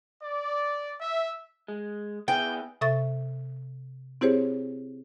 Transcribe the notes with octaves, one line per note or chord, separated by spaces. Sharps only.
D5
E5
G#3
B3 E4 G#4 G5
C3 A4 E5 C#6 A6
C4 E4 G4 G#4 C5 C#5